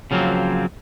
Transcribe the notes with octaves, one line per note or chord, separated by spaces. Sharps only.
C#3 F3 F#3 A#3 C4